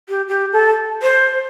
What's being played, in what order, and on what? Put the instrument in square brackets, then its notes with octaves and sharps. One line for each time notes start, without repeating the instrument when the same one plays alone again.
[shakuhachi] G4
G4
A4
C5